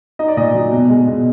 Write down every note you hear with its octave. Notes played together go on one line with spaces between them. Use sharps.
D#4 D#5
D5
A#2 D#5
F#3
B2
G#3
B2